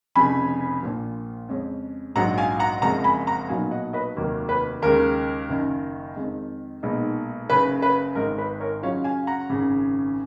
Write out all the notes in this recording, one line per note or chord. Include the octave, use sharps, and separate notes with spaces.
F1 F2 C#3 F3 G#5 B5
A#1 A#2 F3
F2 C#3 G#3 C#4
A#1 G#2 F#3 F#5 A#5
F5 G#5
F#5 A#5
F#1 F2 F3 G#3 F#5 A#5
G#5 B5
F#5 A#5
B1 A#2 F#3 B3 D#4 F5 G#5
D#5 F#5
B4 D#5
F1 D#2 D#3 F#3 A#3
B4
D#2 C#3 G#3 A#4
F#1 F#2 D#3
F2 D#3 G#3
B1 A#2 G#3 B3 D#4
F#1 F#2 C#3 B4
B4
G#1 G#2 D#3 A#4
B4
A#4 C#5
F#2 C#3 F#3 C#4 F4 C#5 F5
F5 G#5
F#5 A#5
G#1 F#2 C#3